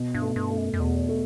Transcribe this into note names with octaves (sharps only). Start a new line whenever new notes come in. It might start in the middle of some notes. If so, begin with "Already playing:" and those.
Already playing: B2
G2
A3
G2
A3
F#2
F#2
E2 B2
A3